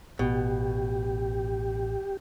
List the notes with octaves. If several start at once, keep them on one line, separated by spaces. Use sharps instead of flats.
A1 B2 G4